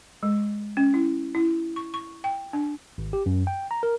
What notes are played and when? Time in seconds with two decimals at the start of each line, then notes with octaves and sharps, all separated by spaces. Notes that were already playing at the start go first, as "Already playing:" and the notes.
0.23 G#3
0.77 C#4
0.94 E4
1.35 E4
1.76 C#6
1.94 C#6
2.24 G5
2.53 D4
2.98 G#1
3.13 G4
3.26 F#2
3.47 G5
3.71 A#5
3.83 A#4